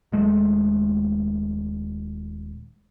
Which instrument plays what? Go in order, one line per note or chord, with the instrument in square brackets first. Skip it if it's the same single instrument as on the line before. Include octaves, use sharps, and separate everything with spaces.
[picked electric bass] D#1 G#3 A3